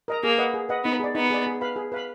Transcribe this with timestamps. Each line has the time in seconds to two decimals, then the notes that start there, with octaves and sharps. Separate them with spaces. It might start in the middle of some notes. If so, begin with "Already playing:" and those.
0.08 A#4 D#5 A#5
0.23 A#3 G#4
0.38 B4 D#5 F#5
0.54 G#4
0.69 B4 D#5 F#5
0.84 B3 D#4
1.00 G#4 D5
1.15 B3 D#4
1.30 G#4 D5
1.46 G#4
1.61 B4 F5 B5
1.76 G#4
1.92 B4 F5 B5